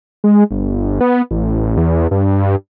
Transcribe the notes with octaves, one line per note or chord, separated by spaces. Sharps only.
G#3
G1
B3
A1
E2
G2